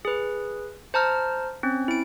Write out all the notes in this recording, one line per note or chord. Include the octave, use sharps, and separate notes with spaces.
G#4 B4
C5 A5 A#5 F6
C4 C#4
E4 D7